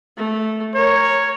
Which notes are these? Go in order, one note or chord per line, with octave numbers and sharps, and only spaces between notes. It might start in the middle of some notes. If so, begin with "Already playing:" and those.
A3
A#4 C#5